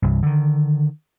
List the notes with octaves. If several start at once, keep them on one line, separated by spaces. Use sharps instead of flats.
C2 G2
D3 D#3